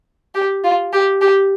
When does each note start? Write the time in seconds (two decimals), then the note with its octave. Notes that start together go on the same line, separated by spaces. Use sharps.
0.35 G4
0.64 F4
0.93 G4
1.21 G4